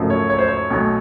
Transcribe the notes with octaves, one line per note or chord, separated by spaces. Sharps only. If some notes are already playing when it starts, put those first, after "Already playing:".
Already playing: G#1 F#2 C#3 F3 A3
C#5
C#5
C5
C#5
B1 B2 F#3 A3